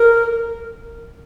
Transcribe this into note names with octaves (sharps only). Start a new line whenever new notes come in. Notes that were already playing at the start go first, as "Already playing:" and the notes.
Already playing: A#4